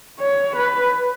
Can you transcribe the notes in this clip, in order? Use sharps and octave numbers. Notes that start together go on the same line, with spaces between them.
C#5
B4